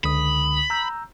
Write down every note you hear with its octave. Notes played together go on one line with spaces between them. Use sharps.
C#2 D3 B5 D#6
A#5 E6 G6